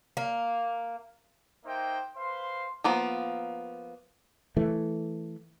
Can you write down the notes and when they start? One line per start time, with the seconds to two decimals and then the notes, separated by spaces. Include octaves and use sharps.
0.17 A#3
1.65 A#3 D#4 C5 E5 G5
2.16 B4 C5 F5 C6
2.84 F3 A#3 B3
4.57 E3 A3